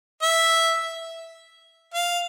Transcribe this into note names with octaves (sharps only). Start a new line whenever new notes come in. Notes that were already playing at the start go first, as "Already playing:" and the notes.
E5
F5